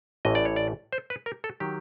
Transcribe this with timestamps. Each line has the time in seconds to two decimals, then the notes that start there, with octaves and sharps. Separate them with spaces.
0.25 A1 A2 E3 D#5
0.35 D5
0.45 C#5
0.56 D5
0.92 C5
1.10 B4
1.26 A#4
1.44 A4
1.60 D#3 F#3 G4